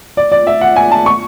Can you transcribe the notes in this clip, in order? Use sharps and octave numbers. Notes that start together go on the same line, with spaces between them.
D5
D5
E5
F#5
G#5
A5
C#6